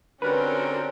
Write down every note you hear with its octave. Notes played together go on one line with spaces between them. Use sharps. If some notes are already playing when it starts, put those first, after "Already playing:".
D3 G3 C4 C#4 F#4 A#4 B4